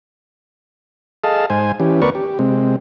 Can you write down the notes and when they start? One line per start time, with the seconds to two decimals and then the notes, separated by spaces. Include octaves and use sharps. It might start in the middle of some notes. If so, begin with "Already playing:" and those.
1.24 G#4 A4 D#5 F5 A5
1.50 G#2 C5 G#5
1.80 E3 C#4 G4
2.02 D2 B3 A#4 B4 D5 C#6
2.15 G4
2.39 C3 G#3 C4